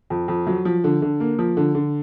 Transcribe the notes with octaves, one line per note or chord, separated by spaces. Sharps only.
F2
F2
F#3
F3
D3
D3
A#3
F3
D3
D3